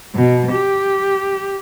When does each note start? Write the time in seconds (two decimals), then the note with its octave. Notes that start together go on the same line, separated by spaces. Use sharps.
0.14 B2
0.50 G4